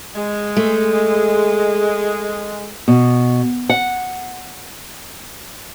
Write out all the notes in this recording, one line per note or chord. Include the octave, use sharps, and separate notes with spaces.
G#3
A3
B2
F#5